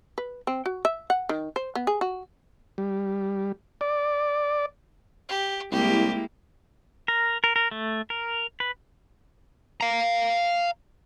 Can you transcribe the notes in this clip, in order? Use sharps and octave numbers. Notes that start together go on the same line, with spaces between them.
B4
C4
F#4
E5
F#5
D#3
C5
B3
G#4
F#4
G3
D5
G4
C2 G#3 A#3 E4 G4
A#4
A#4
A#4
A3
A#4
B4
F5 A#5